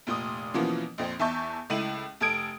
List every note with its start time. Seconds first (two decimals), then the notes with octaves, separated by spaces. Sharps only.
0.07 F1 A#2 D#6
0.54 B2 E3 F3 A#3 B3 C#4
0.98 A#1 F2 C4
1.19 E2 E5 A5 C#6 G6
1.70 C#2 A3 E4 D#7 F#7
2.20 F1 A4 D#6 G#6 D7